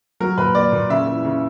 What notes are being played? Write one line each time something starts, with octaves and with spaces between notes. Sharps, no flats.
F#3 A#4
A#2 B4
A#3 D5
A#2
C#3 E5
E3
C#3